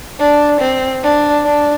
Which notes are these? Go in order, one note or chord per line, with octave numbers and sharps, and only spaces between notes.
D4
C4
D4
D4